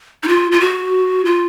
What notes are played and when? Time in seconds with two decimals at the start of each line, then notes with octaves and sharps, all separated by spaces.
0.23 D#4
0.28 F4
0.52 F4
0.60 F#4
1.25 F4